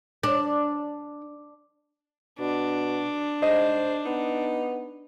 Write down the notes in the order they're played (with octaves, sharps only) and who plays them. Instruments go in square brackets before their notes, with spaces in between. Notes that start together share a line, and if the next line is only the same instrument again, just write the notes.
[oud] D4
[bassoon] B2 [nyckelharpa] D4
[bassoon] G#2 [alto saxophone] C5 [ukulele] D#5
[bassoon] B3 [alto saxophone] D#4